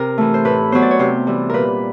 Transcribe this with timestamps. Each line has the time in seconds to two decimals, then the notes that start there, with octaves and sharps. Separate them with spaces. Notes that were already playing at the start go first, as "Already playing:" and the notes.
Already playing: C3 A#4
0.18 E3 A3
0.34 C5
0.45 A2 B4
0.72 F#3 B3 C5
0.82 D5
0.91 C#5
0.99 C3 C5
1.27 E3 G3
1.50 A#2 A#4 B4